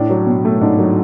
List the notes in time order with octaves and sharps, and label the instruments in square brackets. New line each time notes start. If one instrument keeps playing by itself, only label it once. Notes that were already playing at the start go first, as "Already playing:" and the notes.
Already playing: [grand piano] A2 [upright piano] D4
[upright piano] F#3
B2
A3
[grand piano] G#2 [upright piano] D4
[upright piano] F#3